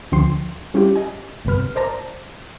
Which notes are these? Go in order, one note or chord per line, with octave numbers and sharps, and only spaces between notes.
D2 D3 F3 G5 C6 C7
G3 C#4 E4 F4 G4
D#5 G#5
G#1 G2 C3 B4 F6
A#4 C5 D5 A5 A#5